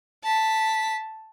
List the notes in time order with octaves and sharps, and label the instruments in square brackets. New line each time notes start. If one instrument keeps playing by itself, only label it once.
[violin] A5 B6